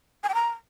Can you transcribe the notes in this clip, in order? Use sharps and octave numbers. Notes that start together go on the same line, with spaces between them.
G#5
G5
A#5